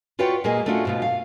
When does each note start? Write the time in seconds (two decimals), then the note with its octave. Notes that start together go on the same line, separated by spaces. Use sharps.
0.19 F4 F#4 B4 C#5 D5 G5
0.44 A#2 G#3 A#3 G#4 D#5
0.66 A3 C#4 D4 F4 F#4
0.85 G#2 B2 F4
1.02 F5